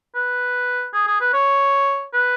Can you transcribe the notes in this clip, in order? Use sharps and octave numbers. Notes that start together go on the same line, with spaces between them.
B4
G#4
G#4
B4
C#5
B4